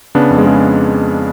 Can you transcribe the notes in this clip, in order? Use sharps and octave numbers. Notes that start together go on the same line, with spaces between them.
C#3 B3 D4
F2
G#3
C#3